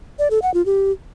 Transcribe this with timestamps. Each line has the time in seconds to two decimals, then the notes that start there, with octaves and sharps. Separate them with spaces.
0.19 D5
0.31 A4
0.42 F#5
0.54 F4
0.66 G4